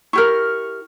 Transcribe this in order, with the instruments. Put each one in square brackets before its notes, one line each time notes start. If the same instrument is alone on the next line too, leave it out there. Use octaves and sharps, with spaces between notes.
[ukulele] E4 G4 A#4 [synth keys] C#6 F6